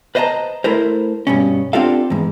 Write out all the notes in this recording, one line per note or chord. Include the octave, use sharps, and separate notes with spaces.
B4 C5 D#5 F#5 A5 A#5
A3 E4 A4 A#4 C5
G2 B2 C#4
C4 D4 F4 G4 A4 F5
E2 G#2